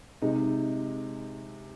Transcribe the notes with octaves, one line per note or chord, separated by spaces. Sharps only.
C3 G#3 D#4